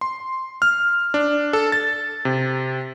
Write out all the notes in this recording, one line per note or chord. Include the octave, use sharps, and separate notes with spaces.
C6
F6
D4
A4
A6
C3